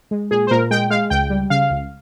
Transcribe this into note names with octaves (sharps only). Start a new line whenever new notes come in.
G#3
A#2 G#4
C5
A#2 A#4
G#3 G5
G#3 F5
C#2 G5
G3
C#3 F5
C#2